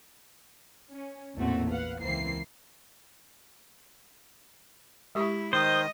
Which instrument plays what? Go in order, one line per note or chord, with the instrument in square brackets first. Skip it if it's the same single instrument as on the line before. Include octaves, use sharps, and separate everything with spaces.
[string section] C#4
A1 E2 A#2 A3 C4 F#4
B4 F5 F#5
C#2 E3 A#3 C4 C7
[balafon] G#3 G4 C#6 [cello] E4
[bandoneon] D#3 D#6 [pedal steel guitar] C5 [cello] D#5